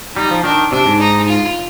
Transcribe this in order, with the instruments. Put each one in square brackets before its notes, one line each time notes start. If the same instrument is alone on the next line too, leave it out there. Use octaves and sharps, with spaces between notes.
[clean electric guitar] G3 [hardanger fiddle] D#4
[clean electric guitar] F3
[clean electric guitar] D#3 [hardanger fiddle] D4
[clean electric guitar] C3 [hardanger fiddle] D4
[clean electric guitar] G#2
[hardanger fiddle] D#4
F4